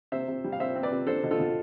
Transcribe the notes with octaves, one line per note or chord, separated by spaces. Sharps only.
C3 C5 E5
C3
G3
F5
C3 C5 E5
C4
B4 D5
C3
D4 A4 C5
B2
F4 A4
B2